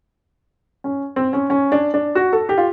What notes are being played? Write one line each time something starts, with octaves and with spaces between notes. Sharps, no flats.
C#4
C4
C#4
C#4
D4
D4
F#4
A4
G4
F4